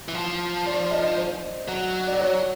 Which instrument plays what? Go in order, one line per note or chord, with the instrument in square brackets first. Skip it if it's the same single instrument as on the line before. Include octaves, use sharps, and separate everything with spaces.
[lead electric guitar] E3
F3
[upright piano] D5
D#5
C5
[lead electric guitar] F#3
[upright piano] D5
C#5